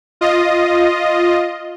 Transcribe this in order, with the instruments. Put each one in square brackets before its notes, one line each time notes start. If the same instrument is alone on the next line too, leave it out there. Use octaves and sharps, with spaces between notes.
[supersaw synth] F4 D#5